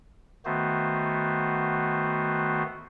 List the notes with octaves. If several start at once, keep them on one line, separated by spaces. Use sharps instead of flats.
D#3 A3 B3 F#4 C5